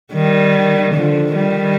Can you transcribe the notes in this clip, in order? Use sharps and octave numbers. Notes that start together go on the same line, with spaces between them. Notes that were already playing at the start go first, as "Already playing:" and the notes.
D#3 G3
D3 F3
D#3 G3